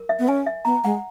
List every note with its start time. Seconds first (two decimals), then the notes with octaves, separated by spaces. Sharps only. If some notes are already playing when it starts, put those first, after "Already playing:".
Already playing: A#4
0.09 E5
0.19 B3
0.28 C#4 G#5
0.46 E5
0.65 B3 A#5
0.84 G#3 F#5